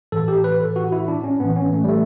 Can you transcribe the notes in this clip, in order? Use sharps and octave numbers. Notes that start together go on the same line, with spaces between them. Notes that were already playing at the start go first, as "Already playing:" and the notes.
A2 E3 A4
G4
B4
A4
F#4
E4
D4
C#4
A2 E3 B3
C#4
A3
G3
A3